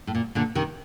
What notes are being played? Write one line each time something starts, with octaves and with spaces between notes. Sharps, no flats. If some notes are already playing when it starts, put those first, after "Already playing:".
A2
A#2
A#2 D3
C3 D#3